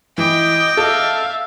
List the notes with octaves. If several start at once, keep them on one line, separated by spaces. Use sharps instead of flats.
E3 D#5 G5 D6
A4 E5 F5